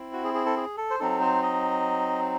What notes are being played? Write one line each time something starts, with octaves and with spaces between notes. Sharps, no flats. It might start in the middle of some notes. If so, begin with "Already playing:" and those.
Already playing: C4 E4
F#4
G#4
G#4
A4
G#4
A4
C5
F#3 C4 D#4 A4
C5
D#5